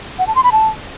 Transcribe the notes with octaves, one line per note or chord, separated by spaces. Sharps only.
F#5
A5
C6
B5
A5